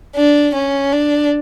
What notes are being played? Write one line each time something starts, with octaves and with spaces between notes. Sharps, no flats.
D4
C#4
D4